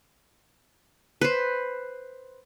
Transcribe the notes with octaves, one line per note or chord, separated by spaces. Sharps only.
B4 C5